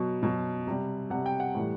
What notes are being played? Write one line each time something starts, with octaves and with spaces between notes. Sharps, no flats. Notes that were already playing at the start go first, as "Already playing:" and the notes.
Already playing: B2 F#3
B2 F#3
C3 G3
C3 G3 F#5
G5
F#5
A2 E3 G3